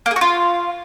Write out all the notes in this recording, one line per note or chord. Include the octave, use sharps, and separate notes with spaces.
A#3
G#4
F#4
F4